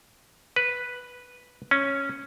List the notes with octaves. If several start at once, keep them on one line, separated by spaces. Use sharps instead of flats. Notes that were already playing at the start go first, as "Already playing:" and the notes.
B4
C#4